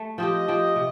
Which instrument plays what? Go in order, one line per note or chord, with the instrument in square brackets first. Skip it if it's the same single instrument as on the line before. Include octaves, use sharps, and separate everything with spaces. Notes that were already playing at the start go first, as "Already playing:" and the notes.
Already playing: [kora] A3
[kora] F3 C4 G4 [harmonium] D#5
[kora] F3 C4 G4
C3